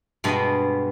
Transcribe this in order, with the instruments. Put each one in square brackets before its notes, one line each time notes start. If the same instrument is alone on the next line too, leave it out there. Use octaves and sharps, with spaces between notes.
[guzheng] G2 B2 G#3 B3